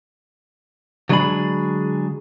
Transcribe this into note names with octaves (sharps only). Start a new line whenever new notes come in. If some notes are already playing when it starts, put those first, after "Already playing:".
D3 F#3 G#3 D4 G#4 B5